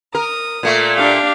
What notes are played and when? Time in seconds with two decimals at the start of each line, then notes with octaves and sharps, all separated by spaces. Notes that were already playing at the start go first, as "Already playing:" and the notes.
0.15 A#4 D#6
0.63 A#2 A3 A#3
0.95 D4 G4 F5